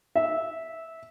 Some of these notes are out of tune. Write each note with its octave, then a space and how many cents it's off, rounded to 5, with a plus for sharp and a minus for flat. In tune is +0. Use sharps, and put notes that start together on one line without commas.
E5 -15